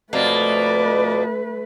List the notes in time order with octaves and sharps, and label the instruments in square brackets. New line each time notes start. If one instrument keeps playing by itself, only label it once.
[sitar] F2 B2 A#3 [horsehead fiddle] A3 B4 [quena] D5